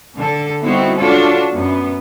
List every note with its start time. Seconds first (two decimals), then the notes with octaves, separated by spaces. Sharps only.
0.16 D3 A4
0.63 G3 B3 C4 D#4 E4 F#4
0.97 D4 F4 F#4 A4 C#5
1.52 F#2 B3